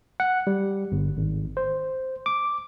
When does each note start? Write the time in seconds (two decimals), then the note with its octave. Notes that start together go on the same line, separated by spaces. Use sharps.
0.20 F#5
0.47 G3
0.92 G1
1.17 G#1
1.57 C5
2.26 D6